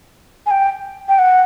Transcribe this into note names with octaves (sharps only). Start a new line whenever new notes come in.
G#5
G5
G5
F#5